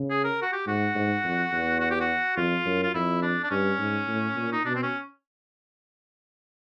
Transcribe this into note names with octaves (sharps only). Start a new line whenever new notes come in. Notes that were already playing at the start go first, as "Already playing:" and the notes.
Already playing: C#3
G#4
A#4
F#4
G4
G#2 F#4
G#2
F2
E2
F#4
G4
F#4
F2 F4
F#2
F4
F2 E4
D4
D4
G2 C#4
G#2
A2
A#2
D#4
B2 D4
C4
C#4